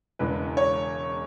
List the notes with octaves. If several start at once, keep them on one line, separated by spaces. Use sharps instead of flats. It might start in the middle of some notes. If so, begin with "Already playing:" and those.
E1 E2 C#3 G#3 B4
C#5